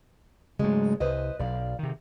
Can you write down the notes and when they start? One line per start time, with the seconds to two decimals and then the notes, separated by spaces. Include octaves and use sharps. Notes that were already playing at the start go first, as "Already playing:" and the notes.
0.59 G#2 C#3 F#3 G#3 A3
1.00 C2 B4 C5 D#5
1.39 B1 D5 F5
1.79 C3 D#3